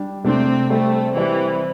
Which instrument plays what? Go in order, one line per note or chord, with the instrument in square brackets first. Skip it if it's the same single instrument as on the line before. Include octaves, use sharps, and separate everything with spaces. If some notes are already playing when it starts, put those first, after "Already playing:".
Already playing: [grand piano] G3 D4 G4
[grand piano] C3 A3 D4 [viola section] C4
[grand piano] G3 C4 G4 [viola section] A3
[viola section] E3 [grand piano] G3 C4 E4 G4